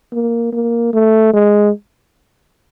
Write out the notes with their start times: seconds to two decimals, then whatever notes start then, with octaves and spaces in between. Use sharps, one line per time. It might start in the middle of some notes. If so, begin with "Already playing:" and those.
0.12 A#3
0.53 A#3
0.93 A3
1.34 G#3